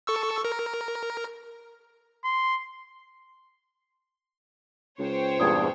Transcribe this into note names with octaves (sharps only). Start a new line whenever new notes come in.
A4 C#6 E6
A#4
C6
C#2 C5 C#5 G5
E2 G2 A#2 G#4 D#6 G#6